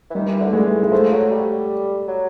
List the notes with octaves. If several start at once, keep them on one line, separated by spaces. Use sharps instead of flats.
E3
D#3 G3
E3
D3
A3
E3 G#3
G#3
F3 A3
F#3
G3
F#3